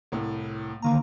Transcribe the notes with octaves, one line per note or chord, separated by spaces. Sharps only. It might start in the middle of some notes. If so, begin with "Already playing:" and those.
C2 A2
D3 D#3 A#3 A#5